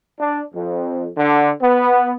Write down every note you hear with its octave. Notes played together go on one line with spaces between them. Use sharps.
D4
F2
D3
B3